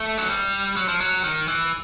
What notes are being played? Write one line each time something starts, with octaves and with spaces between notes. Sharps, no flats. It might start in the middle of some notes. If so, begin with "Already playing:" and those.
Already playing: A3
F#3
G3
F#3
F3
F#3
D#3
E3